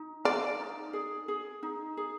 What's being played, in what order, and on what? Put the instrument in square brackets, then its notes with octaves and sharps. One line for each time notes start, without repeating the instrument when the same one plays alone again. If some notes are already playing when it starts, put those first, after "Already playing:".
Already playing: [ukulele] D#4
[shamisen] D5 [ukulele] F5
[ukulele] D#4
G#4
G#4
D#4
G#4